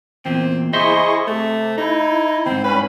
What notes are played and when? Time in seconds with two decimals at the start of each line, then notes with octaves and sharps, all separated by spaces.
0.26 E2 A#2 C4
0.73 E4 G#4 C5 D#5 E5 C6 C#6
1.28 C3 A3
1.78 D#4 E4
2.46 D#2 G#2 C4
2.64 G2 C#4 B4 B5